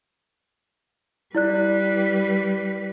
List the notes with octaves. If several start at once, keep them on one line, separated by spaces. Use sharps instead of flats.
G3 E4 B4 D5 F#6